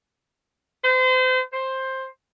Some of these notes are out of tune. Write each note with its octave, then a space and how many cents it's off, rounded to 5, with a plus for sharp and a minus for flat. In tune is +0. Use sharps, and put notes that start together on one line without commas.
C5 -35
C5 +10